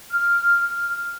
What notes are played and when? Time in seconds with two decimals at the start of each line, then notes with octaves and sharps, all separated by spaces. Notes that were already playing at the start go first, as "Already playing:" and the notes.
0.11 F6